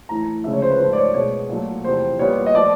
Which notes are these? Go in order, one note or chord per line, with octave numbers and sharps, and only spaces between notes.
A2 E3 A3 A#5
D2 C#3 F3 G#3 E5
C#5
C5
B4
G#2 F3 A3 C5
D5
C#5
B2 G#3 B3 C#5
A#2 F#3 A3
E2 C3 F3 C5
A#2 G3 B3 C#5
D#5
F3 A3 D5